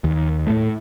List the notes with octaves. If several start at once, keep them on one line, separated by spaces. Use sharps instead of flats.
D#2
A2 A3